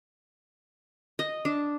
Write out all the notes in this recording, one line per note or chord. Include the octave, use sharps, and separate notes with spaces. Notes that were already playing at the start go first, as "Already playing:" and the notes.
D#5
D4